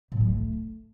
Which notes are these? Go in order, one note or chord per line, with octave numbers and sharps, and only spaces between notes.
A2
G3
A3